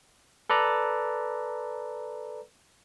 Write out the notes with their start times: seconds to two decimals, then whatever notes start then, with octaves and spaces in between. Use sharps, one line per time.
0.50 A4 B4 D5 A#5